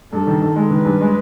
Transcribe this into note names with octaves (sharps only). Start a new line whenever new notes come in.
G2 A4
D#3
D#3
G#3
D#3 B4
G2
G#3